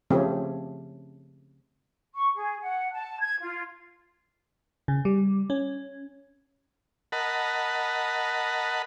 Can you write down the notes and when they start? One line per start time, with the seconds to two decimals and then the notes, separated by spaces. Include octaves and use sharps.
0.10 C#3 F3 A3 C4 C#4 G4
2.14 C#6
2.35 G#4
2.61 F#5
2.92 A5
3.21 G#6
3.41 F4
4.88 C#3
5.05 G3
5.50 C#4
7.12 A#4 D#5 F#5 A5 B5